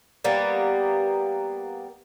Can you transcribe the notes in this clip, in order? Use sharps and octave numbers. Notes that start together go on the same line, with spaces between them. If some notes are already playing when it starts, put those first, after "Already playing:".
G3 A#3 B3